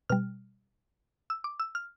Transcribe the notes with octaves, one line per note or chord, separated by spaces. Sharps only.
B2 G3 F6
E6
D6
E6
F6